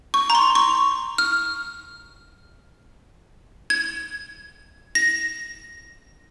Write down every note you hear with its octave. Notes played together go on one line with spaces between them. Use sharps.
C#6
A#5
C6
C#6
F6
G#6
A#6